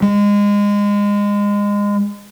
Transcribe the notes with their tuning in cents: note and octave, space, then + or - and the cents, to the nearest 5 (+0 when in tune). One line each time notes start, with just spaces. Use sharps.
G#3 -25